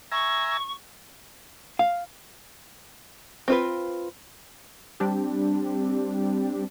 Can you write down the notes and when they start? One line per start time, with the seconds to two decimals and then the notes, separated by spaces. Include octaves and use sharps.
0.12 E5 G#5 A#5 C#6
1.79 F5
3.48 C4 F4 B4
5.00 G3 C4 D4 G4